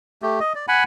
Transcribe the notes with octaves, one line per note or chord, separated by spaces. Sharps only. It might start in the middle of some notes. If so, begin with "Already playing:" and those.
A3 G4
D#5
D5
F#5 G#5 B5